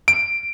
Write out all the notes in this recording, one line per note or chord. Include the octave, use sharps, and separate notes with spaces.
D7